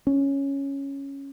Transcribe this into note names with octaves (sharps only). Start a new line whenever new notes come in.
C#4